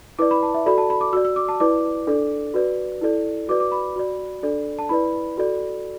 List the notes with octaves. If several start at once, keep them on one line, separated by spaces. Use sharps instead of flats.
E4 B4 D5 D6
B5
A5
E5
F#4 A4 D5 B5
A5
B5
D6
F#4 D5 E6
E6
D6
A5
E4 B4 D5 D6
D4 A4 D5
F#4 B4 D5
E4 A4 D5
F#4 B4 D5 D6
D6
B5
F#4 D5
D4 A4 D5
A5
E4 B4 D5 B5
F#4 A4 D5